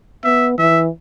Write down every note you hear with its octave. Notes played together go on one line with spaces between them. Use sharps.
B3 E5
E3 E5